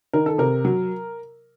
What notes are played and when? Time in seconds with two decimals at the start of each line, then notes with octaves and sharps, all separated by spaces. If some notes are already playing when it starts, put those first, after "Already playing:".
0.13 D#3 A#4
0.26 A4
0.38 C3 A#4
0.65 F#3